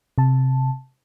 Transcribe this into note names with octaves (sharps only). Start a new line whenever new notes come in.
C3 A5